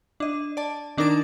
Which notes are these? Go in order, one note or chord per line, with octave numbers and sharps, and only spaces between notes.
D4 D#5
D5 A5
D#3 D4 D#4 A#4 D6 A6